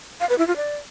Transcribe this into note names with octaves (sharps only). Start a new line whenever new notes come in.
F5
B4
E4
F4
D5